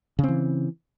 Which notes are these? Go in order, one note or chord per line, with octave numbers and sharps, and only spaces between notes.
C#3 E3 C4